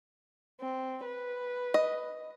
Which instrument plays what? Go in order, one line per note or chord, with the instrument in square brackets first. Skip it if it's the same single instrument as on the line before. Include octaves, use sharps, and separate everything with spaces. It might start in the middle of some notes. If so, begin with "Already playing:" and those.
[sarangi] C4
B4
[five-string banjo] D#5